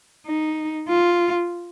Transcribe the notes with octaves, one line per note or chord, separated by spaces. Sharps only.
D#4
F4